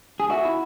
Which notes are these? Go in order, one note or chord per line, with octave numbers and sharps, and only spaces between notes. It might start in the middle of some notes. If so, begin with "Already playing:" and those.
G#4
F#4 E5
E4